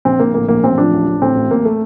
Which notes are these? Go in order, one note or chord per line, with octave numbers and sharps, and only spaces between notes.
A#1 C4
A#1 A#3
A2 A#3
A#1 A#3
A1 C4
F3 D4
A1
A1
A2 C4
A1
A1 A#3
A3